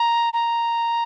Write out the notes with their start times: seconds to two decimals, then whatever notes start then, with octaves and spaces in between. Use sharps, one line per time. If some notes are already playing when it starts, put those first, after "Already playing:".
Already playing: A#5
0.33 A#5